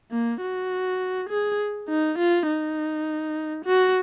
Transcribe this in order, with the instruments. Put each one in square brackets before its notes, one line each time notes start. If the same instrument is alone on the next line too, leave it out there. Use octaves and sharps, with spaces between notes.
[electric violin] A#3
F#4
G#4
D#4
F4
D#4
F#4